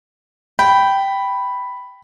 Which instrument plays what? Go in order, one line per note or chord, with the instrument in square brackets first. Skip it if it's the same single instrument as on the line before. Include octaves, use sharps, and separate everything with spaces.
[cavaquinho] G5 [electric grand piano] B5